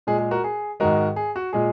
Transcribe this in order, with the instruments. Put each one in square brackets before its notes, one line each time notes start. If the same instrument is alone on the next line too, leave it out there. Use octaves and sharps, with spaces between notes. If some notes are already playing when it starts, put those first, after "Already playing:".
[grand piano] A#2 G#3 G#4
G#4
F#4 A#4
G#4
G#2 D#3 G#3 F#4 A#4
G#4
F#4
A#2 G#3 G#4